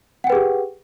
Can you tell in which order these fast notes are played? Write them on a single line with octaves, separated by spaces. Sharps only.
F#5 G5 B4 G#4 G4